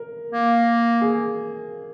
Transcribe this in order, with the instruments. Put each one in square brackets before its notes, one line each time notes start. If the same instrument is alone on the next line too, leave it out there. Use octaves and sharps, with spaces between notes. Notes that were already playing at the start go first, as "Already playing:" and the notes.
Already playing: [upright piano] A#4
[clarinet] A#3
[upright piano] G#4